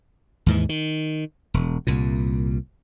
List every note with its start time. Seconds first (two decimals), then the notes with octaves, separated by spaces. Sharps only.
0.46 D#2 G#2 E3
0.69 D#3
1.54 E1
1.87 C2 A#2